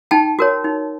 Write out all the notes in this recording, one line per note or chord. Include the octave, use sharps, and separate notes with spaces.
D#4 G5 A5
F#4 A#4 C#5
D#4